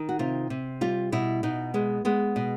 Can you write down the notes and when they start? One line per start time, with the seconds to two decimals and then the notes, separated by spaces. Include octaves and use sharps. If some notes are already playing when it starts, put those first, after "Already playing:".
Already playing: D#3
0.09 F#4
0.19 C3 F4
0.50 C3
0.81 G3 F4
1.12 B2 E4
1.43 B2 D#4
1.74 G#3 B3
2.05 G#3 B3
2.36 B2